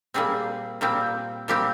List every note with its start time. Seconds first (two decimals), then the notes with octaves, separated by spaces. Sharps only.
0.14 A#2 G3 C4 G#4
0.81 A#2 G3 C4
1.48 A#2 G3 C4 G4